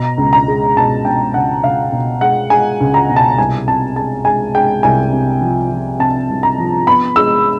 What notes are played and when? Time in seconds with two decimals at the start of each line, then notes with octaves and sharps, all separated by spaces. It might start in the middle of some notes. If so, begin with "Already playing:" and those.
Already playing: B2 A#5
0.18 C#2
0.33 A#5
0.48 G#3
0.77 B2 A5
1.05 B2 G5
1.34 C#2 F#5
1.64 C#2 F5
1.92 B2
2.21 G#3 F#5
2.50 G#3 G#5
2.81 C#2
2.94 A#5
3.09 B2
3.16 A5
3.38 C2 G#5
3.68 C3 A5
3.96 G#3 A5
4.25 G#3 G#5
4.54 G#3 G5
4.83 C2 G#5
5.13 C3
5.41 F3
5.71 F3
5.99 C3 A5
6.29 C2
6.43 A#5
6.58 F3
6.87 B3 B5
7.16 G#3 E6